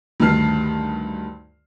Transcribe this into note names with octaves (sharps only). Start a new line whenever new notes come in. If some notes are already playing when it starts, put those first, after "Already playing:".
D2 G2 D#3 A5 F6 C7